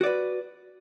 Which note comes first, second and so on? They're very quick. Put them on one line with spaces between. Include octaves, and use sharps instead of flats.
F#4 D5 B4